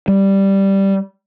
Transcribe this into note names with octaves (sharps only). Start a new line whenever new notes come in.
G3